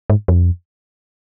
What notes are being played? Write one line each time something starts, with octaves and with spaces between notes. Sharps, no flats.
G#2
F2